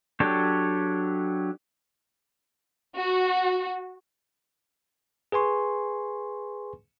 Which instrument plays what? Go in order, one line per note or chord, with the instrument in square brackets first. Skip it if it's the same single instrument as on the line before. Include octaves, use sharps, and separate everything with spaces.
[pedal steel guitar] F#3 D4 G4 A4 C#5
[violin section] F#4
[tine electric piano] G#4 B4 G#5 C6 C#6